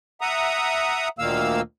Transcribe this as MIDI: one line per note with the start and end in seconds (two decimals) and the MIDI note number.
0.21 1.08 76
0.21 1.08 78
0.21 1.08 82
0.21 1.08 87
1.19 1.61 38
1.19 1.61 46
1.19 1.61 51
1.19 1.61 58
1.19 1.61 77
1.19 1.61 88